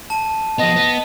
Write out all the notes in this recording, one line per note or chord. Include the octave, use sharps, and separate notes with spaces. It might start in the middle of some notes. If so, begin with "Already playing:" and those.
A5 D#7
F3 B3 D#5
B3